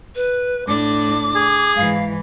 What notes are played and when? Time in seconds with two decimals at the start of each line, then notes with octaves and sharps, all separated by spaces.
0.16 B4
0.67 A2 D4 D6
1.35 G#4
1.76 G#2 E3 F5